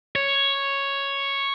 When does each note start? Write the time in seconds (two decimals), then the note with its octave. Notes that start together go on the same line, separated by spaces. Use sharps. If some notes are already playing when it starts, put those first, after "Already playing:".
0.15 C#5